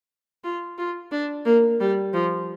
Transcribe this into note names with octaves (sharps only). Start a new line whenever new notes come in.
F4
F4
D4
A#3
G3
F3